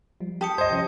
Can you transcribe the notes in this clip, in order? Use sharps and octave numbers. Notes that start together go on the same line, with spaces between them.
F3 G3
G4 A5 D#6 C#7
C#2 G2 C5 D#5 G#6
C3 F3 C#4